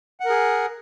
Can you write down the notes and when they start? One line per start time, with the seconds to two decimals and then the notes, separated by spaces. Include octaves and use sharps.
0.20 F#5
0.25 A#4
0.30 G#4